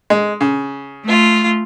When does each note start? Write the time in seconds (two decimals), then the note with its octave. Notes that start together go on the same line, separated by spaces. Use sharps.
0.10 G#3
0.41 C#3
1.04 A3 F4